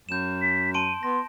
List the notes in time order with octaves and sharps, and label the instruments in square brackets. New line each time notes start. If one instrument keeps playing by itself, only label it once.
[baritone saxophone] F#2 [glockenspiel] G6 E7
[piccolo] B6
[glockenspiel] A5 C6 D7 [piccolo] D#7
[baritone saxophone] B3 [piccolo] C6 [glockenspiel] A#6